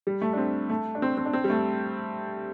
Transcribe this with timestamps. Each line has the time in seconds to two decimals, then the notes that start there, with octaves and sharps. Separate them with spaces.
0.07 G3
0.22 A3
0.33 D4
0.38 C4
0.70 A3
0.95 D4
1.02 C4
1.17 C4
1.26 D4
1.33 C4
1.44 G3
1.50 A3